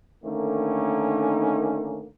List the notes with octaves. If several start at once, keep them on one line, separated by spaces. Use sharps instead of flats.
D3 D#3 A3 A#3 C#4 D#4